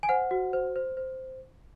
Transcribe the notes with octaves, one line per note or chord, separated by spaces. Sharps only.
G#5
C5 F#5
F#4
C5
C5
C5